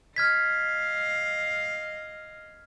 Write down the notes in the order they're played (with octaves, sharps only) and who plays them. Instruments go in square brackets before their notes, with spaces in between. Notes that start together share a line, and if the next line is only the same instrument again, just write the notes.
[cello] D#5 F5 [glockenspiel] F6 G#6 B6